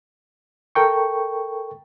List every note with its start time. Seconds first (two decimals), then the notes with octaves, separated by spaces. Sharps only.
0.75 A4 A#4 G5 C#6